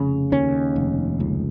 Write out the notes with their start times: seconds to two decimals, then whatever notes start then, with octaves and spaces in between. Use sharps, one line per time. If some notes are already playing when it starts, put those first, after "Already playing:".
Already playing: F1 C#3
0.32 D#2 C#4
0.76 F1
1.20 C#2